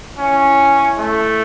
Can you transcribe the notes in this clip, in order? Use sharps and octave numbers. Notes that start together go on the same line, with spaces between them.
C#4 E4
A3